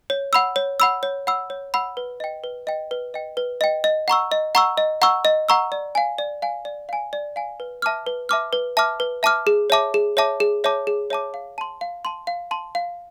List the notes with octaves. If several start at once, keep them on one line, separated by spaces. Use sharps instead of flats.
C#5
F#5 B5 E6
C#5
F#5 B5 E6
C#5
F#5 B5 E6
C#5
F#5 B5 E6
B4
D#5 G5
B4
D#5 G5
B4
D#5 G5
B4
D#5 G5
D#5
F#5 A#5 C#6 E6
D#5
F#5 A#5 C#6 E6
D#5
F#5 A#5 C#6 E6
D#5
F#5 A#5 C#6 E6
D5
F5 G#5
D5
F5 G#5
D5
F5 G#5
D5
F5 G#5
B4
E5 A5 D6 F6
B4
E5 A5 D6 F6
B4
E5 A5 D6 F6
B4
E5 A5 D6 F6
G#4
C#5 E5 A5 D6
G#4
C#5 E5 A5 D6
G#4
C#5 E5 A5 D6
G#4
C#5 E5 A5 D6
F5
A5 C6
F5
A5 C6
F5
A5 C6
F5